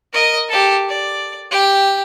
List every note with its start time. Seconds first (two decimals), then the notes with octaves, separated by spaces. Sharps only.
0.13 A#4 D#5
0.48 G4 A4
0.89 D5
1.51 G4 G5